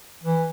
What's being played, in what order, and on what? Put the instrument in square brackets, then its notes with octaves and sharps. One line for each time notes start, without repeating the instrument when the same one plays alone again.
[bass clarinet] E3